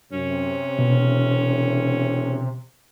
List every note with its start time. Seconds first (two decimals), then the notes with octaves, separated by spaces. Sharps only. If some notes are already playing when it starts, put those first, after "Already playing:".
0.12 F#2 C3 C#4
0.79 E1 B2